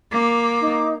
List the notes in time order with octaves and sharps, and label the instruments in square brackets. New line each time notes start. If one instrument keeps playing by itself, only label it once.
[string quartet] A#3 [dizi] D6
[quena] D#4